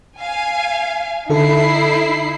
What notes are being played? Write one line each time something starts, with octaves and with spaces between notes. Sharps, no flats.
F5 G#5
D3 D#4 E4 A4 C7